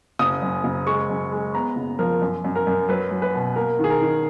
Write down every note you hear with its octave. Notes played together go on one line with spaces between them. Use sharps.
F#1 D#6
F#2
F#1
G#3 C#6
F#2
G#3
B3 A#5
F#1
F3 A#4
F#2
F#2
A#4
F#2
F#3 B4
F#3
B4
B2
A#3 A#4
D#3 G#4
A#4
D#3